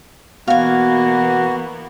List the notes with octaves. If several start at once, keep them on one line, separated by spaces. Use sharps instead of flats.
B2 E3 A#3 B3 F#4 F5 G#5